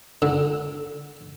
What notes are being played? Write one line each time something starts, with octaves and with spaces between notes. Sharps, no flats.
D3